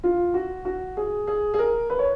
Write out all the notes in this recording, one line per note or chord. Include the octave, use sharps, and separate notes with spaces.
F4
F#4
F#4
G#4
G#4
G#4
A#4
B4
C#5